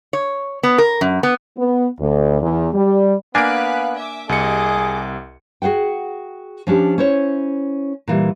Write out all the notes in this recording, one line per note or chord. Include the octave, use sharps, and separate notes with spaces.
C#5
B3
A#4
F#2
B3
B3
D2
E2
G3
A#3 B3 D4 F5 G#5 F#6 B6 D7
E5 D6
C2 C3 G#4 D#5 D6 C#7
F#4 G#4 C5 F#5 G5
F3 C#4 D4 G4
C#4 E4 C5 C#5
A#2 E3 G3